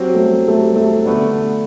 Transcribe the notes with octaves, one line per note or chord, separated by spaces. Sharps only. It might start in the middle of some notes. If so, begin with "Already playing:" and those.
Already playing: F#3 C4 G4
A3
G3
A3
G3
A3
D3 A3 B3 D4